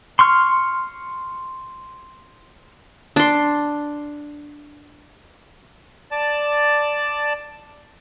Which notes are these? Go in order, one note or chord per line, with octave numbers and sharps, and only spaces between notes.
C6 C#6 F6
D4 C6
D5 A5